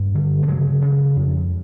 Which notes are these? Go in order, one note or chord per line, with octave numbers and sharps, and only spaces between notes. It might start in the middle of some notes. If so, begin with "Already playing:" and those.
Already playing: G2 F#3 G#3
D3
A3
C#3 F#3 G#3
C#3
F2